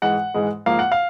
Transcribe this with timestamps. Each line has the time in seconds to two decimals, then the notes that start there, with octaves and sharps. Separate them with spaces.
0.02 G#2 E3 G#3 F#5
0.34 G#2 E3 G#3
0.66 G#2 F3 A#3 F5
0.79 F#5
0.92 F5